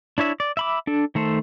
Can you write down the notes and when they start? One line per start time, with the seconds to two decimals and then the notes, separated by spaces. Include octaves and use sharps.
0.18 D4 E4 C#5 E5
0.40 D5
0.57 E5 B5 D6
0.87 D4 A4
1.15 D#3 A3 A4 C5